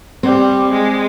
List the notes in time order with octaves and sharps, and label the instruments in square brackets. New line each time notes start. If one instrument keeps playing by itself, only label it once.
[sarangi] G3 [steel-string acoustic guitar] C4
[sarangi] G#3